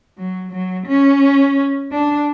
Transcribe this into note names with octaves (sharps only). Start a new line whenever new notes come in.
F#3
F#3
C#4
D4